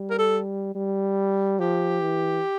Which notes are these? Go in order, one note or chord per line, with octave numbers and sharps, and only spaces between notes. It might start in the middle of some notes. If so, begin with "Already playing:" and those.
Already playing: G3
A#4
A4
G3
F3 G4
E3